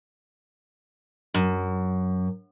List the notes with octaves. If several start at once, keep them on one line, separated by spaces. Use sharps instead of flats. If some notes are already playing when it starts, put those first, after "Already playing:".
F#2